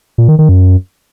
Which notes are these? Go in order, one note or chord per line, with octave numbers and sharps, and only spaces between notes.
A#2
D#3
D#3
F#2